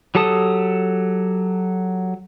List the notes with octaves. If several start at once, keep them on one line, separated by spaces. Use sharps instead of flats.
F#3 G4 A4 A5 D#6